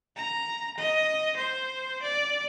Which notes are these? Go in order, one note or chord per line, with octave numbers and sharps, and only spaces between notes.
A#5
D#5
C5
D5